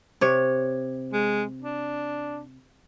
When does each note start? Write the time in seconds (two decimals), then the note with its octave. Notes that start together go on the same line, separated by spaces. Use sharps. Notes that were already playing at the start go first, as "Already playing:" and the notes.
0.21 C3 C#5
1.13 G#3
1.62 D4